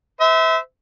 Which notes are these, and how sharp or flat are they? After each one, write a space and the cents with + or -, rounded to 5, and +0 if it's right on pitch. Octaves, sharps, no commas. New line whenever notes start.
C5 -45 E5 -25